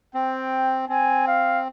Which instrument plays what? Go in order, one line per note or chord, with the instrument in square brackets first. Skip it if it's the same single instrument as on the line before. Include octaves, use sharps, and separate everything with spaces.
[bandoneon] C4 [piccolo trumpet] G5
[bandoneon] C4 [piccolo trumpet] G#5
[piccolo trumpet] F5